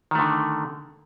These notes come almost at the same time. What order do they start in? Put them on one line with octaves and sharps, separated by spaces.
D#3 A3 D3